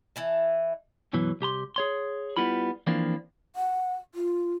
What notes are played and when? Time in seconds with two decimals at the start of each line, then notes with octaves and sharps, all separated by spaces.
0.16 E3 E4 A5
1.13 F#2 B2 E3 F#3
1.41 C2 G4 A#5 C6
1.76 G#4 C#5 C6
2.37 G3 B3 E4 F4 B5
2.87 E3 F3 A#3 C4 D4 F4
3.56 F#5
4.15 F4